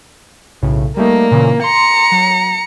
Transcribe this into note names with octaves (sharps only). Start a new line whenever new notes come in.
B1 A2 C#3
G3 A3 A#3 D#4
A#2 C#3 E3
A#5 C6 C#7
F#3